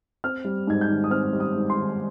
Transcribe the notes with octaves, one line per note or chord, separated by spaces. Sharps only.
C4 F6
G3
G#2 G#6
G6
D#3
D#6
C4 F6
G3
D#6
G#2
C6
D#3